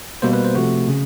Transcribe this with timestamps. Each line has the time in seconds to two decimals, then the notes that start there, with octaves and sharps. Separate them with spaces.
0.22 B2 G3 A#3 C5
0.33 B4
0.45 C5
0.55 C3 F3 A3 F#4
0.89 C#3